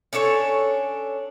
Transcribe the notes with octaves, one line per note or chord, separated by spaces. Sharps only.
C#4 D4 A4 C#5